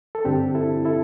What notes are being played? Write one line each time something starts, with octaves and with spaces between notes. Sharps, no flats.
A4
G2 D3 C4 D4 G4
E4 A4
E4 A4